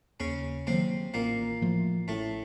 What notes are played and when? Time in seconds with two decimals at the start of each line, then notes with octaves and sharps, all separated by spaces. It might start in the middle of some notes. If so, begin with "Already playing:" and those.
0.20 D#2 C#3 C#4
0.67 C3 D#3 F#3 A#3 C4
1.14 A1 A#2 A#3
1.61 A2 F3 A3
2.08 A1 A2 A3